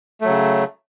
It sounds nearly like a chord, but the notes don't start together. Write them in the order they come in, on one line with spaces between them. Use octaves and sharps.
A3 F#3 C#3